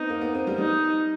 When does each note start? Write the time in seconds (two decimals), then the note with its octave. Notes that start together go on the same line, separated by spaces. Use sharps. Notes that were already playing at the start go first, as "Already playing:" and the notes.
Already playing: B3 C4 D#4
0.10 A#3
0.21 B3
0.35 C4
0.47 G3
0.58 G3 D#4